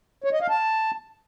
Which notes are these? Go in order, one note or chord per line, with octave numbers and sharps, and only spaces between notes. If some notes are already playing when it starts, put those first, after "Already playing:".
C#5
D#5
F5
A5